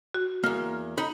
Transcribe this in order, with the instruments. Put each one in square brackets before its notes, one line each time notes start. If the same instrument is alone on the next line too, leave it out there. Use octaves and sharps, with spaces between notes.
[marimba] F#4
[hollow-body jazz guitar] E2 A#3 [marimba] F6
[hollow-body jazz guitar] D#4 B5